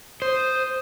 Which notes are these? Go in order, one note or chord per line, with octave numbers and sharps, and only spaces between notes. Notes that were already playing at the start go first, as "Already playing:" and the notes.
C5 D#6